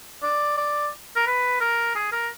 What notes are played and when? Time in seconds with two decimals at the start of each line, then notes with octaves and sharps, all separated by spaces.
0.23 D5
0.58 D5
1.16 A#4
1.27 B4
1.61 A#4
1.96 G#4
2.12 A#4